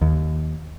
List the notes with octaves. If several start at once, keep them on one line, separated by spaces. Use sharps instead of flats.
D#2